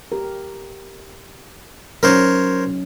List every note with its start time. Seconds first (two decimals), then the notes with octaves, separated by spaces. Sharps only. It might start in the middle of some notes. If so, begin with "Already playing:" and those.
0.12 G4 A#4
2.03 F#3 C#4 D#4 A#4 C5 C#5